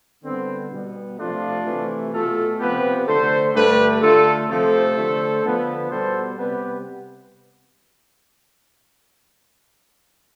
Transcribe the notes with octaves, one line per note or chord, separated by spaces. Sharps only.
D3 G3 B3 C4
B2 G3 B3
C3 F3 A3 D4 F4
C3 E3 A3
B2 A3 F4 A4
C3 F3 B3 G4 B4
D3 A3 A4 C5
G2 D3 A3 G4 B4
D3 A3 F4 A4
C3 F3 A3 A4 C5
D3 A3
D3 F3 B3
B2 G3 B3 A4 C5
C3 G3 B3 G4 B4